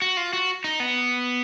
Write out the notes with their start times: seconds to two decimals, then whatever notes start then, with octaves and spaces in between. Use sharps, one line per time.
0.02 F#4
0.17 F4
0.33 F#4
0.64 D#4
0.80 B3